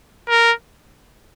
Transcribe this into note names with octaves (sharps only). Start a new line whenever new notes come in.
A#4